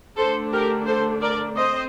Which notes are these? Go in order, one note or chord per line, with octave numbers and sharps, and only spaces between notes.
D3 A3 D4 A4 C5
G4 A#4
A4 C5
A#4 D5
C4 C5 D#5